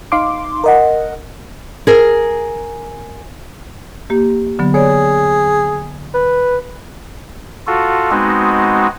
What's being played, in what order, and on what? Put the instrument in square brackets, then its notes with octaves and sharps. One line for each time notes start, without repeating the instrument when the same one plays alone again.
[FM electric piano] D#4 F5 C6 D6
A#4 D#5 F#5
[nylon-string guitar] G#4 A#4
[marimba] A#3 G4
D3 F#3 B3
[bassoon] G#4 [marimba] C#5 D5
[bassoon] B4
[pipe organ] F4 F#4 A4
G#3 B3 C4 D#4 F#4